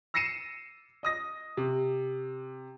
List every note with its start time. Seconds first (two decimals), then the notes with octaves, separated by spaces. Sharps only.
0.14 E6 A#6 C7 C#7 D#7 E7
1.03 D#5 D#6 A#6
1.57 C3